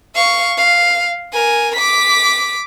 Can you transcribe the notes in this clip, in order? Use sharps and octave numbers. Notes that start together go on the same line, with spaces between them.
F5 C#6
F5
A#4 G#5
D6 B6